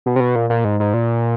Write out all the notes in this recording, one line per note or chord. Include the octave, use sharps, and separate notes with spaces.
B2
C3
B2
A#2
A#2
G#2
G#2
A#2